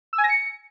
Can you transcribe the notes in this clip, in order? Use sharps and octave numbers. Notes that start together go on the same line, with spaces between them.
E6
G#5
A#6
C#7